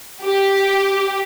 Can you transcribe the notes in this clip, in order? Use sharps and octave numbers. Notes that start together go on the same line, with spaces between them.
G4